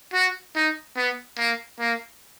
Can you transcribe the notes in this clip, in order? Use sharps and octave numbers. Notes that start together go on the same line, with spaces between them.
F#4
D#4
B3
A#3
A#3